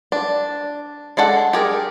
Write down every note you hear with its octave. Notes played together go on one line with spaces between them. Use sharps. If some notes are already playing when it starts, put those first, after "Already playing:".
D4
G#3 D4 A4 F#5
G4 G#4 A#4